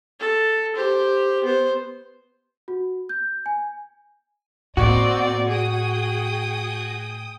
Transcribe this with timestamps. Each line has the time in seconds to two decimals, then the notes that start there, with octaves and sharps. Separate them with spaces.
0.20 A4
0.75 G4 C5
1.44 B3 C5
2.68 F#4
3.09 G6
3.46 G#5
4.77 A2 A#3 C4 F#4 D5 D#5
5.49 G#4 G5 D#6